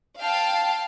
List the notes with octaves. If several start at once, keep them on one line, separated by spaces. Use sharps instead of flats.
F5 G5 A5